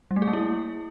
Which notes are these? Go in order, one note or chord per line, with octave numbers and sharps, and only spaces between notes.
G3
A3
G#4
A#3
E4